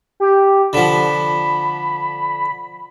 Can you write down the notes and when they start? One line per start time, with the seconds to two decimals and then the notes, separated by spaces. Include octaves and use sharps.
0.20 G4
0.73 D3 F3 B5